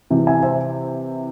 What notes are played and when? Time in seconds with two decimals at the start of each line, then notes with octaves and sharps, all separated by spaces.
0.10 C3 E3
0.27 E5 G#5
0.43 C5 E5